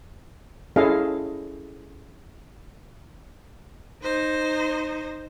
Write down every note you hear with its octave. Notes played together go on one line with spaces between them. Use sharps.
C#4 E4 G#4 A4 D#5 F5
D#4 C5